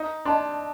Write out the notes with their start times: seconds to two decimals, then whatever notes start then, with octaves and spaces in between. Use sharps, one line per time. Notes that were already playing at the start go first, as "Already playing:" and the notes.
Already playing: D#4
0.25 D4 D#5 A5 C6